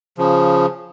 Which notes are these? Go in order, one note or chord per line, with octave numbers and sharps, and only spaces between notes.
C#3 F3